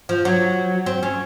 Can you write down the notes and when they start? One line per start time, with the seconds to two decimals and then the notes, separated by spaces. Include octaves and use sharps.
0.09 F3
0.25 F#3
0.86 C4
1.03 C#4